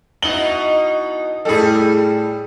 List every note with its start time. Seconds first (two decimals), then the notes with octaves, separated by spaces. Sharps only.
0.22 B2 D#4 E4 F#7 G7
1.45 A2 G3 G#4 A4